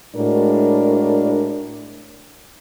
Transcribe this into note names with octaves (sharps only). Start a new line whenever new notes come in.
A2 G#3 D4 F#4 A#4 D5